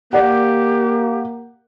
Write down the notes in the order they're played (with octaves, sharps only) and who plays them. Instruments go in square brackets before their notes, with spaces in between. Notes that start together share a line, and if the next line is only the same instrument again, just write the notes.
[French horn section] A#3 [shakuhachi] G4 [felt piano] D5 F#5